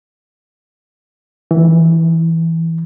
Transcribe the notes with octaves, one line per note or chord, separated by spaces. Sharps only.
E3